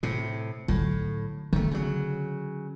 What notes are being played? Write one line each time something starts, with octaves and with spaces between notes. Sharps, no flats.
A2 C3
A2 D3 F#3
D3 D#3 A3
C#3 F#3